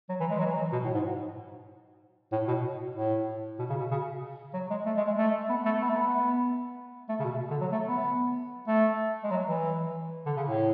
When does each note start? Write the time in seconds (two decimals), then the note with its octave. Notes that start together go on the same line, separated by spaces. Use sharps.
0.09 F#3
0.20 E3
0.31 G#3
0.38 F#3
0.46 E3
0.55 F#3
0.72 B2
0.84 A2
0.94 G#2
2.32 A2
2.48 B2
2.95 A2
3.59 B2
3.69 C#3
3.80 B2
3.91 C#3
4.54 F#3
4.70 G#3
4.86 A3
4.97 G#3
5.07 G#3
5.18 A3
5.49 B3
5.65 A3
5.82 B3
5.89 A3
5.97 B3
7.09 A3
7.20 C#3
7.24 B2
7.50 D3
7.61 F#3
7.72 A3
7.88 B3
8.67 A3
9.24 G#3
9.31 F#3
9.47 E3
10.26 D3
10.37 C#3
10.47 A2